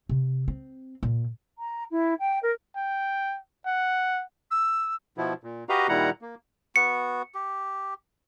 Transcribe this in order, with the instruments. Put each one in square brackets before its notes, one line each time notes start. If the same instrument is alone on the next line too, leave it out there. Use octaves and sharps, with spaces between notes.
[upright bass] C3
C4
A#2
[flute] A#5
E4
G5
A#4
[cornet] G5
F#5
[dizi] E6
[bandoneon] B2 F3 B3 E4
A#2
F#4 G4 B4 D#5 F5 A#5
A#2 D#3 G3 E4 F#5 A#5
A#3
[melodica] B3 F#4 [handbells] C#7
[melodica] G4